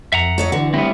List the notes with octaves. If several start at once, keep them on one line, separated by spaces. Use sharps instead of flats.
F2 E5 F#5 A#5
A4 C#5 D#5
D3 E3 F#4
G3 A3 B3 C4 E4